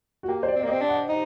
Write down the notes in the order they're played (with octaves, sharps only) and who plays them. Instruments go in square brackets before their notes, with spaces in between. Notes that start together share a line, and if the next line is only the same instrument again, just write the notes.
[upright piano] F#4
[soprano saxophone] A#3 [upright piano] G4
[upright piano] C5
D5
[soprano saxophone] C4
[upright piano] D5
[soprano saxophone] A#3
[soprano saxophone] C4 [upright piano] D#5
[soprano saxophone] D4
[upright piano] F#5
[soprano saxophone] D#4 [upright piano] D#5